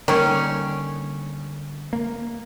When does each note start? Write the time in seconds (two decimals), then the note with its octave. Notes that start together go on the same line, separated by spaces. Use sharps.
0.08 D3 D#3 G3 A#3 C#4
1.93 A#3